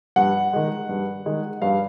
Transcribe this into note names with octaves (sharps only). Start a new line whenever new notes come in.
G2 F#5
D#3 G#3
G2
D#3 G#3
G2 F5